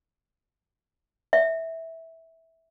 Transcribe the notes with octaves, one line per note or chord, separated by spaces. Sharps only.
E5